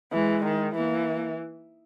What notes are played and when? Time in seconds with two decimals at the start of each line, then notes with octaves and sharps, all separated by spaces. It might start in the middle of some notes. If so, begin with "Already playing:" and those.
0.13 E3 G#3
0.45 D#3
0.76 E3 A#3